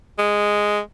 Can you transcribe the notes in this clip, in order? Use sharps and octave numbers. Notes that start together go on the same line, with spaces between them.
G#3